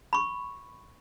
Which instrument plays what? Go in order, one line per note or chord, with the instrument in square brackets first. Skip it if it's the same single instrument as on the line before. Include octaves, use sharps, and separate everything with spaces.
[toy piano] B5 C#6